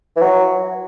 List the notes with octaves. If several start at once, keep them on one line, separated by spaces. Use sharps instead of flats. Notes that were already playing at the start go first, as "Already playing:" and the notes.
E3
F#3